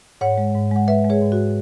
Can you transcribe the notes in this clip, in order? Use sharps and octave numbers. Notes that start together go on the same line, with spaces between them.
G#2 C#5 F#5
G#3
G#2
G#3 F#5
G#3 B4 E5
G#3
G#4 C#5
G#2
F#4